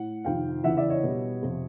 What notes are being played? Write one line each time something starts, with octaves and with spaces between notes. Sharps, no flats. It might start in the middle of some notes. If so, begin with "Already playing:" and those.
Already playing: A2 F#5
F2 C3 D#3 F5 G5
E2 C#3 E3 E5 F#5
D5 E5
C#5 D#5
B2 G3
F2 C3 F3